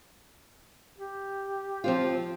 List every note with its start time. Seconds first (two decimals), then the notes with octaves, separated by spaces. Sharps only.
0.98 G4
1.84 F3 C4 F4